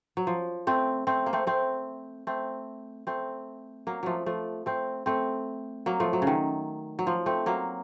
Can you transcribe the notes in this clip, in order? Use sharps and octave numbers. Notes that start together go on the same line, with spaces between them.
F#3
F3
A3 C4
A3 C4
A#3
A3 C4
A3 C4
A3 C4
A3 C4
F#3 A#3
F3 F#3 A3
F3 A3
A3 C4
A3 C4
F#3 A#3
F3 A3
F#3
C#3
D#3
F#3
F3
A3 C4
F#3 A#3